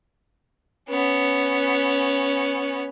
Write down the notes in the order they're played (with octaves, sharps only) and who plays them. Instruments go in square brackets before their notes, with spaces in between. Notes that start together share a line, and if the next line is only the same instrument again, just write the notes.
[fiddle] B3 C#4